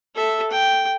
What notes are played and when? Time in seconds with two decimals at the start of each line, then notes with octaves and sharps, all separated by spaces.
0.15 A4 E5
0.51 G5